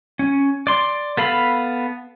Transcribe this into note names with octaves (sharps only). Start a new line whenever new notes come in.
C#4
D5 C6
B3 A4 F5 B5